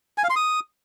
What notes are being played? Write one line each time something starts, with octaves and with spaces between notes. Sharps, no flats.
G#5
F5
C6
D#6